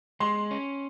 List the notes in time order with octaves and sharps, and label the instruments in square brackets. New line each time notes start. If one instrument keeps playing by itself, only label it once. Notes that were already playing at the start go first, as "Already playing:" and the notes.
[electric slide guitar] G#3 [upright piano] C6
[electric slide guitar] C#4